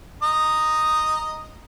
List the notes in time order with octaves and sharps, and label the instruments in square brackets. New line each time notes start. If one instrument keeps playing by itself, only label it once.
[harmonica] D#5 A#5 D#6